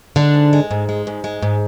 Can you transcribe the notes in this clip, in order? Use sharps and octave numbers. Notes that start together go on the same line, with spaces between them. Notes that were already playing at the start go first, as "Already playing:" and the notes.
D3 G#3 D4
G#2
G#3
G#2
G#3
G#2
G#3
G#2